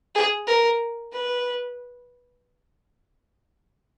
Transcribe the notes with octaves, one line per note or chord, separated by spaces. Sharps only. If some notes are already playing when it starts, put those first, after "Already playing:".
G#4
A#4
B4